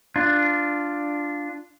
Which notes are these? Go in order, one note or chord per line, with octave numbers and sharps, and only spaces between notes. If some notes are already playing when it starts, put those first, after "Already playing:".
D4 F4